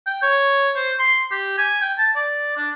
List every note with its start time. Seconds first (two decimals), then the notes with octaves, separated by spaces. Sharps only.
0.07 G5
0.23 C#5
0.76 C5
0.99 C6
1.31 G4
1.58 G#5
1.82 G5
1.98 A5
2.15 D5
2.57 D4